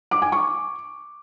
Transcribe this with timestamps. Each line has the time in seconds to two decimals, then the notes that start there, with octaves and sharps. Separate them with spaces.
0.11 D6
0.22 G#5
0.32 C#6